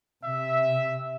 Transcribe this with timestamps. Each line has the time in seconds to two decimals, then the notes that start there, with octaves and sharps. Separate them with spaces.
0.25 C3 E5